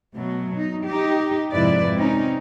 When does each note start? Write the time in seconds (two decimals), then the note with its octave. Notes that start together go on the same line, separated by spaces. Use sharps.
0.15 B2 F#3 A3
0.57 D#4
0.87 D#4 G4
1.53 F2 G#2 C3 E4 B4 D5
1.95 C4 C#4 D#4